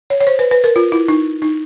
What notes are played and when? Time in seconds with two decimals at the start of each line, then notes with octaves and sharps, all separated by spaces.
0.10 C#5
0.20 C#5
0.27 C5
0.39 B4
0.51 B4
0.64 A#4
0.76 F4
0.92 E4
1.08 D#4
1.42 D#4